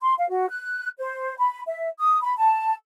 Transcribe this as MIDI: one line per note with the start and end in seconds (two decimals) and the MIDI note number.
0.02 0.14 84
0.18 0.29 77
0.30 0.49 66
0.50 0.89 90
0.99 1.35 72
1.38 1.61 83
1.67 1.88 76
2.00 2.19 87
2.22 2.35 83
2.37 2.73 81